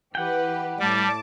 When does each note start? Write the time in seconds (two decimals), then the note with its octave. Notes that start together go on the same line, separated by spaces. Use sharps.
0.15 E3 G4 B4 F#5 G5
0.79 A2 G3 A5 D6